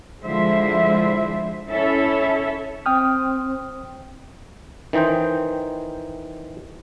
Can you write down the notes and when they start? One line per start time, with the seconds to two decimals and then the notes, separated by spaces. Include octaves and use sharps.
0.25 D3 F3 G#3 E4 C5 E5
1.69 C#4 E4 A4 E5
2.86 C4 G5 D#6 F6
4.93 D#3 E3 D#4 C5 G5